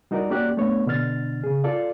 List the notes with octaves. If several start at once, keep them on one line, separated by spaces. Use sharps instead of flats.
G3 D#4 F#4 A#4 D5
A#3 C#4 F#4 G4 D5 F#6
A3 B3 D4 C#5
B2 D3 D4 F6 A6
C#3 G#4
F4 A4 D5 F5